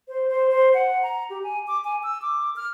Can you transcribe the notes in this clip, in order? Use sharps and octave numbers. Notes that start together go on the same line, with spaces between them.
C5
C5
C5
F#5
A#5
G4
G#5
D6
G#5
E6
D6
F6